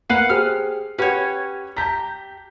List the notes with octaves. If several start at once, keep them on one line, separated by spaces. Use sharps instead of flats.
A#3 B4 F5 F#5 C7
G4 G#4 C5 F6
C#4 G4 B4 C#5 F#5
G4 A5 A#5 G6 B6